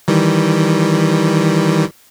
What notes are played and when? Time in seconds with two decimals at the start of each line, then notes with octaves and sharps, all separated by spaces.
0.08 D#3 E3 G3